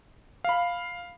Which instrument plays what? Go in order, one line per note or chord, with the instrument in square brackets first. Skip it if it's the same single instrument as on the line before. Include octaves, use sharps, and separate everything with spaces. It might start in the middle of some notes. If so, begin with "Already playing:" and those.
[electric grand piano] F5 B5